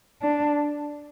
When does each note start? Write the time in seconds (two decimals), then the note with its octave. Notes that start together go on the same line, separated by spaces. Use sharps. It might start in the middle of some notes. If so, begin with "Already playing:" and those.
0.22 D4